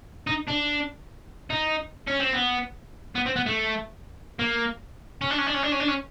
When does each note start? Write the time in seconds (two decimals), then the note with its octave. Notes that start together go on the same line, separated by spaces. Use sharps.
0.27 D#4
0.47 D4
1.51 D#4
2.08 C#4
2.20 C4
2.33 B3
3.16 B3
3.26 C4
3.36 B3
3.46 A3
4.39 A#3
5.21 C#4
5.30 D4
5.38 C#4
5.47 D4
5.54 C#4
5.63 D4
5.72 C#4
5.80 D4
5.88 C#4